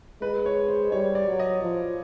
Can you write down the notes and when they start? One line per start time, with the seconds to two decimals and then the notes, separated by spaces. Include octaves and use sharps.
0.22 G#3 B4
0.46 C#5
0.68 C5
0.92 G3 C#5
1.15 D5
1.28 F#3
1.39 D#5
1.62 F3